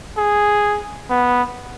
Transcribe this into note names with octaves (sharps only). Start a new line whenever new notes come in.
G#4
B3